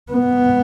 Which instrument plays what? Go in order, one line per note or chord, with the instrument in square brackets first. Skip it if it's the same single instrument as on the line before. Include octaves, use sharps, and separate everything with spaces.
[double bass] B3